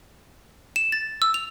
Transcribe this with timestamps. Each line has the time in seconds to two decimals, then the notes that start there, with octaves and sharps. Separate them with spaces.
0.76 E7
0.92 A6
1.22 E6
1.34 F7